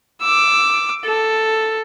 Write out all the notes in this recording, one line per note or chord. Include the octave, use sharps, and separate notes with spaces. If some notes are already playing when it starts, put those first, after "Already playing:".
D6 E6
A4